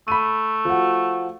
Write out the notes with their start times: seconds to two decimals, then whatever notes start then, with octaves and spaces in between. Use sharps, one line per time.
0.08 A3 B5 D#7
0.65 F3 F#4